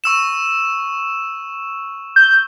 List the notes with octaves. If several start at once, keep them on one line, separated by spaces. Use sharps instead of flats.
C#6 E6 E7
G6